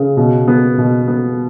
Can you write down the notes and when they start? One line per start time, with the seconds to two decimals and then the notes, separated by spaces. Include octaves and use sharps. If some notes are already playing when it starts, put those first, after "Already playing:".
Already playing: C#3
0.17 B2
0.48 B3
0.78 B2
1.08 B3